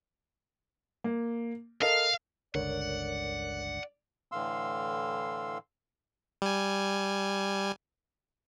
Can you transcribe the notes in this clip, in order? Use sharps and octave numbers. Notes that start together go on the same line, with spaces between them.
A#3
A4 A#4 D#5 F5
G1 C#2 D3 A#4 C#5 D5 F#5
A2 D3 E3 F5 C6 E6
G3 G#5